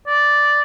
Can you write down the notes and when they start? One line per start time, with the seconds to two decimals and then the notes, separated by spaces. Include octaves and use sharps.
0.07 D5